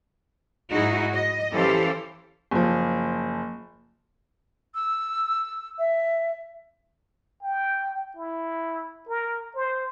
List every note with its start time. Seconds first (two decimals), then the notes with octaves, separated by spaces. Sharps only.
0.73 G#2 D#4 E4 F#4 G#4
1.12 D#5
1.54 E3 C#4 G4 A4 C5 F5
2.51 F#1 F3
4.75 E6
5.79 E5
7.42 G5
8.17 E4
9.08 A#4
9.56 C5